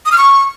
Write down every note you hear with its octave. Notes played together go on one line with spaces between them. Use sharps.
D#6
F6
C#6